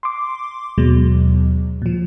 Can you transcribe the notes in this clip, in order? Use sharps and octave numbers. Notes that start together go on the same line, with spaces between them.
C6 D6
D#2 B2 F#3 G#3
A#2 F3